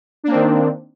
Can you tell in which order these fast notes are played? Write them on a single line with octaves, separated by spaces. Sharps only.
D4 A#3 C4 D#3